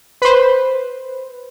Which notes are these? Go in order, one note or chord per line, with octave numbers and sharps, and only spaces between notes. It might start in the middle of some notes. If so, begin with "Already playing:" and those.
B4 C5